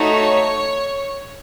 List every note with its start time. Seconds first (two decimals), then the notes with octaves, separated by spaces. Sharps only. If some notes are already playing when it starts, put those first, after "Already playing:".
Already playing: A3 D#4 F#4 C#5